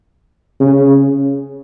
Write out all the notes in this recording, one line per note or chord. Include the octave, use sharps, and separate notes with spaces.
C#3